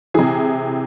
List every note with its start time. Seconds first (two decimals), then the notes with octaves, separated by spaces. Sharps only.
0.14 C3 E3 G#4